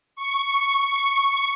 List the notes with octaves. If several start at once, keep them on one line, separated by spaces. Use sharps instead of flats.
C#6